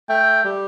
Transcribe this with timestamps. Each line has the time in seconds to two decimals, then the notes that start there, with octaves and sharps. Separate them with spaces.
0.09 A3 G5
0.44 G3